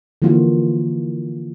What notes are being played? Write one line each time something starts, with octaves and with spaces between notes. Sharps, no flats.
D3 E3 F3 A#3 F4 F#4